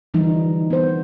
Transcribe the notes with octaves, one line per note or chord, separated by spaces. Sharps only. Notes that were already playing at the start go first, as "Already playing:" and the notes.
D3 E3 F3 G3 D#4
B3 C5